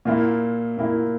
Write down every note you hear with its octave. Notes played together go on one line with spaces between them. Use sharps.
A#2 A#3 E4
A#2 A#3 E4